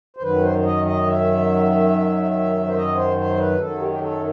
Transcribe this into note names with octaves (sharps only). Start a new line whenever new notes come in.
C5
F#2 D#3 F#3 B4
C5
C5
D#5
D#5
E5
C5
D#5
C5
C5
B4
F#2 D#3 F#3 A4
G4
G4
A4